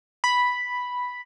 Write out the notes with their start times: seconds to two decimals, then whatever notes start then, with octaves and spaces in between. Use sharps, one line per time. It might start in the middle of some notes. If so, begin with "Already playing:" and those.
0.24 B5